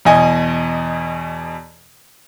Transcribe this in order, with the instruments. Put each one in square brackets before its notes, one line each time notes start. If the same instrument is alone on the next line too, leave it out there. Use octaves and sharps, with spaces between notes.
[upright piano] E2 B2 D#5 G#5